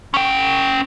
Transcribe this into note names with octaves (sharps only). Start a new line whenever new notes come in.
C#4 G5